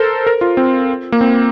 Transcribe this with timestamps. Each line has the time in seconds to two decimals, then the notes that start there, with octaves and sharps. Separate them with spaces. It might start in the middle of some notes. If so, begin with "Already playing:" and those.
Already playing: A4 A#4 C5
0.27 A#4
0.41 F4
0.57 C4
1.12 A#3
1.21 C4